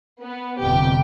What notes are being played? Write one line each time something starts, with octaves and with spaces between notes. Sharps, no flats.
B3
G1 F2 C3 G4 G5